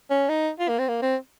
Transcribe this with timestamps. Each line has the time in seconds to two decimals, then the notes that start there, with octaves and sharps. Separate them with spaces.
0.10 C#4
0.29 D#4
0.59 F4
0.69 A#3
0.79 C4
0.88 A#3
1.02 C4